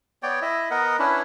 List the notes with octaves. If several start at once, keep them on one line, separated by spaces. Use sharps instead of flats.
B3 C#5 D5 G5
E4 D#5 E5
B3 A#4 D#5 F#5
C#4 D4 E4 B4